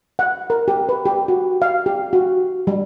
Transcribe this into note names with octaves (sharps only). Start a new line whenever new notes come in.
F#5
A#4
G4
B4
G4
F#4
F5
G4
F#4
G3